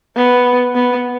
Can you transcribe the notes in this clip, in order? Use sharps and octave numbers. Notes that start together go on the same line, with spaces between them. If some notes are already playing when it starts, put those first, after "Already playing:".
B3
B3